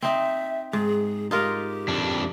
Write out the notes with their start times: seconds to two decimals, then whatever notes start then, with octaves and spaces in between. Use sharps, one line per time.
0.02 C4 D#4 E5
0.73 G#2 G#4
1.31 D#4 F4 G4 A#4
1.88 F2 D4